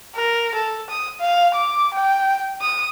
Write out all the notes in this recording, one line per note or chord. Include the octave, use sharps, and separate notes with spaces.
A#4
A4
D#6
F5
D6
G5
D#6